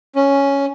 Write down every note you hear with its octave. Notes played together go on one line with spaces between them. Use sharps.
C#4